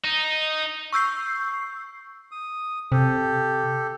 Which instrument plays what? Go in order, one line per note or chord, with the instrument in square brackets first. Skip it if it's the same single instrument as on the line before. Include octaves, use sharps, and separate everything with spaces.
[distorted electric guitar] D#4
[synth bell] C#6 E6 G6 C7
[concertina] D#6
[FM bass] C3 [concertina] G4 A4